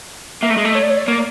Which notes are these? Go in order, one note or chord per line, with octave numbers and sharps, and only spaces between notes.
A#3 E5
A3
D#5
G#3
A3 D#5
C#5
D5
C#5
D5
C#5
A#3 D5